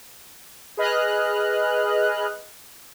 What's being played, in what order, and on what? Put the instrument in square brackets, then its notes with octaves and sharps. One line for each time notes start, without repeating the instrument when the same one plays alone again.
[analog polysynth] G#4 B4 D#5 F6 F#6